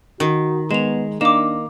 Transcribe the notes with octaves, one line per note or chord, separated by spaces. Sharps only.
D#3 F#4
G#3 B3 E7 F7
A#3 D4 D#4 D6 E7